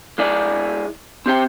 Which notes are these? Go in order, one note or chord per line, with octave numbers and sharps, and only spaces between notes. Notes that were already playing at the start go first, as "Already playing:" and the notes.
G#3 E4 G#4 D5
C4 G4 C5 G5